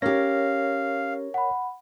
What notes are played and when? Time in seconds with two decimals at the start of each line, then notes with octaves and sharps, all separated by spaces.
0.02 C#4 G4 A#4 C#5 F5 A#6
1.34 F#5 B5